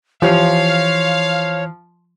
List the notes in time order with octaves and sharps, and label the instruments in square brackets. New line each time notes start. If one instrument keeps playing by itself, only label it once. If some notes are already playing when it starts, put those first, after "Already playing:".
[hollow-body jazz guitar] E3 G4 C5 [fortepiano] F3 [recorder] C#5 [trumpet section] F5